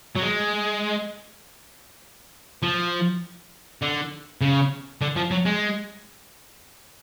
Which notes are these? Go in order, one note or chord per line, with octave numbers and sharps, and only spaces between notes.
F#3
G#3
F3
D3
C#3
D3
F3
F#3
G#3